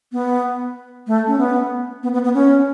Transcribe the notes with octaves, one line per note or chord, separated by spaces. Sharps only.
B3
A3
C#4
B3
B3
B3
B3
C#4